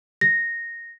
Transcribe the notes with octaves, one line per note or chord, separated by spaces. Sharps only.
A#6